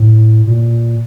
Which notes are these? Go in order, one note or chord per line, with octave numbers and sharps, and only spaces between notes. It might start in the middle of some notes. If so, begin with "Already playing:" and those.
Already playing: A2
A#2